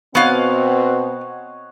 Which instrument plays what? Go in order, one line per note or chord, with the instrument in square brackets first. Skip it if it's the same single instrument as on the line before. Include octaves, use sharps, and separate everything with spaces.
[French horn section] B2 C4 [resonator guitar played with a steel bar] B3 F5 [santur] C#5 D#5 F#5